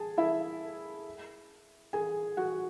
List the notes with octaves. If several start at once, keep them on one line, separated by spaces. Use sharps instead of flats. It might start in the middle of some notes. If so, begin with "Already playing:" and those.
Already playing: G#4 A5
E4 E5
G#4 G#5
F#4 F#5